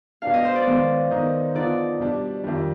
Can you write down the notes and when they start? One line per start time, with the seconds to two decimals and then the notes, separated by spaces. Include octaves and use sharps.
0.22 B2 B3 D4 F5
0.34 D#5
0.45 C5
0.55 D5
0.66 D#3 G#3 B3
1.11 D#3 B3 D#4
1.55 D3 F3 B3 D#4 D5
2.00 B2 G3 D4
2.44 F2 D#3 G3 D4